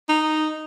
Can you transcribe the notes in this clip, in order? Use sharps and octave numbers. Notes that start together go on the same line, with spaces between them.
D#4